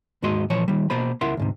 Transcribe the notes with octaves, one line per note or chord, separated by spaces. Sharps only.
D#2 G#2 G#3 F#4 D#5 C6
A#2 E3 F3 C#5
D#3 G3
B2 A#3 C5 B5
C#2 E4 A#4 E5 F#5 C6
D2 G#2 C3